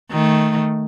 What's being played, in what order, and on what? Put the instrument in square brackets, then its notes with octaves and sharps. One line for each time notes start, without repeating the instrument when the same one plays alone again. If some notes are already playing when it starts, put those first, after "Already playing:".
[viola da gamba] D#3 A3